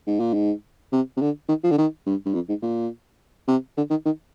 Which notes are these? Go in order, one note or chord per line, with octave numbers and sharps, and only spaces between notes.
G#2
A#2
G#2
C3
C3
D3
D#3
F3
D3
D#3
G2
G2
F2
G#2
A#2
C3
D3
D#3
D#3